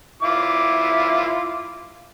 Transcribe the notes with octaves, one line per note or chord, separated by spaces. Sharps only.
E4 F4 D6